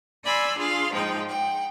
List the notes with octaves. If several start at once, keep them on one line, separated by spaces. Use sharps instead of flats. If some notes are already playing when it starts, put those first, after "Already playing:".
D5 G#5 B5 C6 E6
D4 F4 G#4 F5 C6
G#2 F3 G#3 D#4 G5
F#5 G5